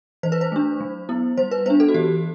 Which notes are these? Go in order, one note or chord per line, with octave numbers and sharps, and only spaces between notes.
E3 C5
B4
C5
A3 D4
F#3
B3 E4
G3 C5
B4
B3 D4 C5
A4
F#4
E3 G4